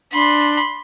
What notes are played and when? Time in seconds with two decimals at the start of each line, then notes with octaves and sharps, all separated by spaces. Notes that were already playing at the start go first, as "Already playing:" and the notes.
0.13 D4 B5 C6